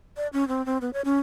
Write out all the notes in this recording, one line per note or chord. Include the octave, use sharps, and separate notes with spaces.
D5
C#4
C4
C4
B3
C#5
C#4